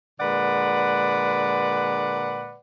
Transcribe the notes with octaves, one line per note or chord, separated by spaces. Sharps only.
A#2 D3 G#3 B4 D5 F#5